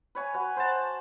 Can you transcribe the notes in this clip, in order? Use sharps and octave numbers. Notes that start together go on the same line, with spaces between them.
B4 C#5 G#5
F#4 B4
C5 F#5 A5